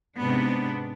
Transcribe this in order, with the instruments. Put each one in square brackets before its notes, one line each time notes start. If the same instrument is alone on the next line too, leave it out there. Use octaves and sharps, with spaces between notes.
[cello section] G#2 C3 B3 D4